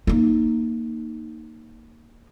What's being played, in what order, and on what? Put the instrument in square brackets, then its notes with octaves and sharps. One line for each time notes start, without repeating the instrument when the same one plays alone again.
[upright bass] A#3 D#4